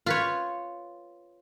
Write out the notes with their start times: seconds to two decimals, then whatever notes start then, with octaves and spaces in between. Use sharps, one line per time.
0.06 F4 B4 C#5